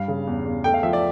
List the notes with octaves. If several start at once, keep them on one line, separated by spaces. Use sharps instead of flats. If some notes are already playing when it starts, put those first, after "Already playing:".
Already playing: G2 G3 F5
C#3
E2
E2
A3 G5
F5
F3 E5
D5